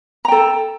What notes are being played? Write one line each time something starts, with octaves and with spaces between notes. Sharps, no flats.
A4 G5 A#5